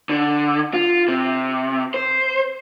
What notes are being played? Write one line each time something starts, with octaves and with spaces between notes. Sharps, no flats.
D3
F4
C3
C5